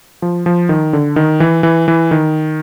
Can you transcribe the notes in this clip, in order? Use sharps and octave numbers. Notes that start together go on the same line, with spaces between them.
F3
F3
D#3
D3
D#3
E3
E3
E3
D#3